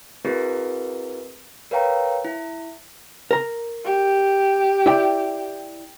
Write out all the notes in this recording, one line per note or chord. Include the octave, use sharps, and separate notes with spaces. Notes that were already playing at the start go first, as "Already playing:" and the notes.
C4 E4 F#4 G#4 A#4 B4
A#4 B4 C#5 F5 G5 A#5
E4
A#4 A#5
G4
E4 D5 G5